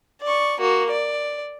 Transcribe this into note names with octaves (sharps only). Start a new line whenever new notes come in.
D5 C#6
A#3 F#4
D5